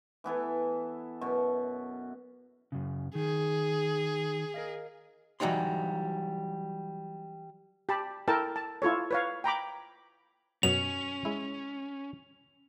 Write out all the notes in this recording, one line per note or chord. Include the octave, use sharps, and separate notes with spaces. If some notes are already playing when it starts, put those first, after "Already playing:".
E3 B3 E4 A4
F#2 B2 C#6
F#2 C#3
D#3 G#4
A#4 D#5 F5
E3 F#3 G3 D#4 C6
G4 A5 B5
E4 A4 A#4 G5 A5
A5
E4 F4 A4 C#5
B4 C#5 F5
G5 A#5 B5 D6
F#2 B2 F#3 C#4 F7
G#3 E4